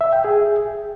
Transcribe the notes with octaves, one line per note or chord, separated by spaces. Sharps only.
E5
G5
G#4